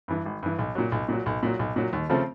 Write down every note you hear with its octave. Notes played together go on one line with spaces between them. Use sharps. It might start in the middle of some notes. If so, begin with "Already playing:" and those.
G2 E3
G#1
G2 E3
B1
A#2 F#3
B1
A#2 F#3
B1
A#2 F#3
B1
A#2 F#3
D#2
C#3 F3 A3 C4